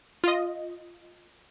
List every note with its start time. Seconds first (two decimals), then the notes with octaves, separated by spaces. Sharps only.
0.24 F4 D#5